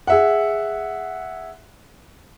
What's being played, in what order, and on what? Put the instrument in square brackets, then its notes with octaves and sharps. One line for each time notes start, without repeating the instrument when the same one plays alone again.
[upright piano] G#4 E5 F#5